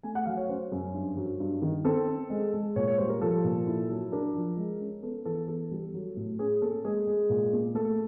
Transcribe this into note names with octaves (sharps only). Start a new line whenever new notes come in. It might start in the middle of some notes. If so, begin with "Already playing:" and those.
A3 G#5
F#5
F#3 F5
C#5
C#4 C5
F#2
G2
F#3
G2
D#3
C4 A4
C4
G#3
G#3
A#2 C#5
C#5
G3 C5
A#4
F3 A4
A#2
E4
F#3
D4 A#4
F3
G#3
C#4
B3 A4
E3 A4
B3 A4
G3
F#3
A2
C#4 G#4
A#3 A4
G#3 G#4
G#3
A#2
A#3
A3 A4